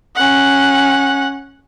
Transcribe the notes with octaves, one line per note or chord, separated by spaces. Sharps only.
C#4 F#5